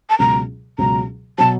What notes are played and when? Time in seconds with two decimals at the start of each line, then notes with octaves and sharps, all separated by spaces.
0.10 A5
0.19 C#2 B2 F#3 A#5
0.78 C#2 B2 F#3 A#5
1.38 B2 F#3 A5